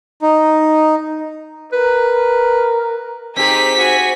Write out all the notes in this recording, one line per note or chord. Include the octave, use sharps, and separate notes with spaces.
D#4
A#4 B4
C4 D#4 G4 G#4 B6
F#4 G#5